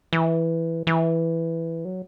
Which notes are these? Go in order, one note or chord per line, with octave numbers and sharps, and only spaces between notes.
E3
E3
F#3